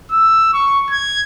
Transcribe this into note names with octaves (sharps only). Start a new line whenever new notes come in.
E6
C#6
G#6